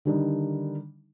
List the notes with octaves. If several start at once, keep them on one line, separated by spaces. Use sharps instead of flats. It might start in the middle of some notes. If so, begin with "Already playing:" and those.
D3 D#3 G3 D4 D#4